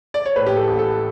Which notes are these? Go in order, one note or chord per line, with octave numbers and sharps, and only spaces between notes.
D5
C#5
A2 B4
G4
A4
A1
A4